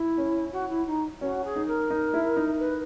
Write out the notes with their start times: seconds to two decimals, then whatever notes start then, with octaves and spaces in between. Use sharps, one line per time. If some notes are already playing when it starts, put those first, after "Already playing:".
Already playing: E4
0.17 C#4
0.52 F#4
0.69 E4
0.86 D#4
1.21 C#4 F#4
1.44 G#4
1.56 D#4
1.67 A#4
1.90 D#4
2.14 E4
2.37 D#4
2.59 B4